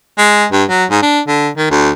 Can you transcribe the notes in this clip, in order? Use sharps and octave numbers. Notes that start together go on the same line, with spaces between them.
G#3
G2
F#3
G#2
D4
D3
D#3
D2